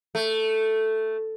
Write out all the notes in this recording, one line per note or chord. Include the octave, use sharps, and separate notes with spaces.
A3